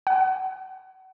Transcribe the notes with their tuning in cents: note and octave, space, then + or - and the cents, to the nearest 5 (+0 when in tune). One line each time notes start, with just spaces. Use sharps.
F#5 +35